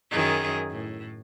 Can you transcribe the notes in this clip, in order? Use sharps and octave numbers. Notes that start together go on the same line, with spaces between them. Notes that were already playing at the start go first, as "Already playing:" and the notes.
F#2 D#3 G#4
A2